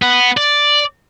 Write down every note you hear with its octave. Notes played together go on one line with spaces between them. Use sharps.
B3
D5